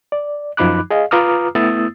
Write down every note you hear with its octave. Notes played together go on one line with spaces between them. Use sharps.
D5
F#2 F3 D#4 B5 D6 F#6
G#4 D#5 F5
F4 B4 A#5 D6 D#6 F6
A3 B3 E4 D#6 E6 A6